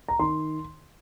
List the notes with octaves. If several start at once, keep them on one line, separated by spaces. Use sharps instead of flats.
A#5
D#3 C6